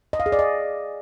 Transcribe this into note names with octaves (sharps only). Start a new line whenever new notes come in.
D#5
F5
G#4
D5
D#5